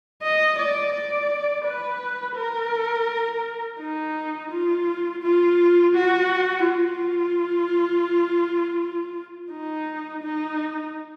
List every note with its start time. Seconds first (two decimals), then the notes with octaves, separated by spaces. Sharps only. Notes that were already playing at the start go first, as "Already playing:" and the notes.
0.23 D#5
0.59 D5
0.94 D5
1.65 B4
2.36 A#4
3.80 D#4
4.52 F4
5.22 F4
5.95 F#4
6.65 F4
9.51 D#4
10.23 D#4